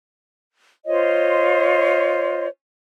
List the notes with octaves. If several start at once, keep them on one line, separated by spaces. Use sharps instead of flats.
F4 C5 C#5 D#5